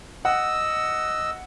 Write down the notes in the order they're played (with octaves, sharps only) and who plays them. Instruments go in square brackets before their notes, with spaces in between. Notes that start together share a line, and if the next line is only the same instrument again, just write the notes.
[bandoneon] D#5 E6 [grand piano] F#5